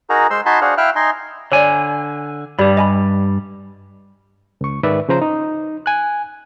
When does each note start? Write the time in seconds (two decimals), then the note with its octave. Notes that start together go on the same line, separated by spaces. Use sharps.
0.10 D#4 F#4 G#4 A#4 A#5
0.30 G#3 C5 C6 E6
0.46 D#4 F#4 G#5 A5 B5 C6
0.61 D4 F#4 G#4 C5 F5 F#5
0.78 E4 E5 F5 G5 F6 F#6
0.96 D#4 D#5 G#5 C6
1.52 D3 C#5 D5 G#5
2.59 G2 G3 G4 D5 B5
2.77 D#5 G#5 B5
4.61 C#2 C#6
4.83 G#2 D#3 B4 D5 E5
5.09 C#3 F3 C5 A#5
5.22 D#4
5.86 G#5 F#6